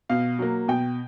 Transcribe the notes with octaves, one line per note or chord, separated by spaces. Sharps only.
B2 F5
F#3 A#3
B2 G5